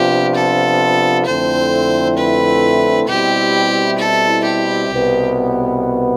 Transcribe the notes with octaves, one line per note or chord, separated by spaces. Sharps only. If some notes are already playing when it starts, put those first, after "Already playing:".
Already playing: C3 F3 B3 D4 F4 G4
A4
F2 D3 A3 C4 E4 C5
B4
B2 G3 C4 E4 G4
A4
G4
C2 B2 B3